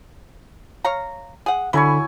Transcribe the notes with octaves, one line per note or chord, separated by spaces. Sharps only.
C#5 F5 A#5
G#4 F#5
D3 F#3 E4 G#5 B5 C#6